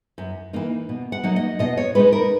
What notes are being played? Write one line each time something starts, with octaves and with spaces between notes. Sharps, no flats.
F#2
E3 A#3 D#4
B2
F#5
F#3 A#3 D#4
D#5
B2 D#5
C#5
G#3 D#4 B4
A#4